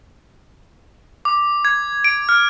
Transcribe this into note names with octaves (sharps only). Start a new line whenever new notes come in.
D6
G#6
D7
F6